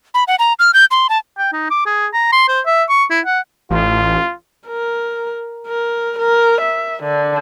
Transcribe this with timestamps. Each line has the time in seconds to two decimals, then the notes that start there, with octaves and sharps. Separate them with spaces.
0.14 B5
0.28 F#5
0.39 A#5
0.59 F6
0.74 G6
0.91 C6
1.09 A5
1.38 G5
1.53 D#4
1.70 D6
1.86 G#4
2.13 A#5
2.32 C6
2.48 C5
2.66 E5
2.89 C#6
3.11 E4
3.26 F#5
3.70 A1 F4
4.67 A#4
5.67 A#4
6.19 A#4
6.62 E5
7.04 D3